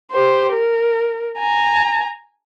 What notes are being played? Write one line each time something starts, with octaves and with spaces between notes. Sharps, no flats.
G4 C5
A#4
G#5 A#5